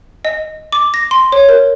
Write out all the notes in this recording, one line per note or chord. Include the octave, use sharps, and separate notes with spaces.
D#5
D6
A#6
C6
C#5
A#4